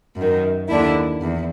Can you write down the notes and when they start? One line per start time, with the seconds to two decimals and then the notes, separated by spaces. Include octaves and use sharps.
0.17 F#2 D#3
0.69 D#2 D3 D4 E4
1.22 E2